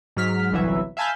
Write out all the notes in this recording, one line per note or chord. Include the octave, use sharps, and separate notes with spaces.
G#2 F#3 F6 B6
G1 C2 E3 F#3 E5
E5 F5 G#5 A5 B5 G6